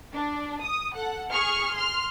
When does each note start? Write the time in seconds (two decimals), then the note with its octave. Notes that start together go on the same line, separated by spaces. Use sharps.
0.14 D4
0.64 D#6
0.95 A4 F#5
1.32 G#4 C#6 F6
1.76 C6 F6